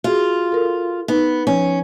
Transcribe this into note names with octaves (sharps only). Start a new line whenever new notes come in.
F4 F#4 G#4
A4 A#4
B3 D#4 B4
F3 C#4